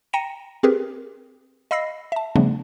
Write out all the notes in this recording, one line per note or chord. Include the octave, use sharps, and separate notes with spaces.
G5 A#5 A#6 C#7 D#7 E7
C4 G4 G#4 A#4 B4
D#5 F5 B5 E6 A#6 C7
E5 A5
C#3 F3 G3 A3 B3 D4